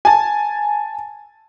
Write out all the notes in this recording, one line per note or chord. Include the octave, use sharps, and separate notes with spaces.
G#5 A5